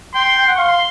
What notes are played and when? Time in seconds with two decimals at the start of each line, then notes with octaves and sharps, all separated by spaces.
0.14 G5 C6
0.38 G5
0.48 F#5
0.57 F5 C6